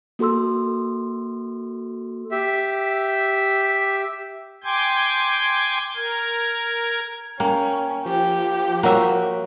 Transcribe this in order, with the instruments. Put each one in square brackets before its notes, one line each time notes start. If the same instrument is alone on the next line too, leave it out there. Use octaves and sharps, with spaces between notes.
[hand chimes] A#3 F#4 A4 C6 E6
[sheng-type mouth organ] G4 E5
[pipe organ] G5 G#5 C6 D6 G6 G#6
A#4 G#6
[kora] A#3 [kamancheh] C#4 [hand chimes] G5
[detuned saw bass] F3 [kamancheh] G4
[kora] A#3 F#4 E5 [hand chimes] C#5 F#5